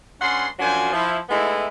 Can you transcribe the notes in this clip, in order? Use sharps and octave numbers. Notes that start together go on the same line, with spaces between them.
G2 C#4 F#5 C6
F#2 F3 F#3 D4 C5 G#5
F3 E4
G#3 A3 B3 D#4 E4